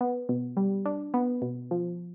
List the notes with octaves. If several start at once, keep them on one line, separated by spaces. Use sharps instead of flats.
B3
B2
G3
D4
B3
B2
F3